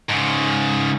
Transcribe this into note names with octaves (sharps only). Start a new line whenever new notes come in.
G#2 C#3